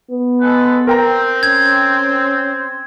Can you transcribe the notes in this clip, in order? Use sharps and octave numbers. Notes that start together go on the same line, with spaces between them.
B3
G#3 A4 B4
C4 A#4 G5 A#5
C#4 G#6